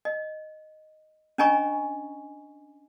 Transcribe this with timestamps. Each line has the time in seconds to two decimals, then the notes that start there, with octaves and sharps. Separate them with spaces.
0.05 D#5
1.38 C#4 D4 D#5 G#5 A#5 C#6